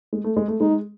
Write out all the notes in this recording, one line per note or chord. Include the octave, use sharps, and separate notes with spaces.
G#3
A3
G#3
A3
G#3 D#4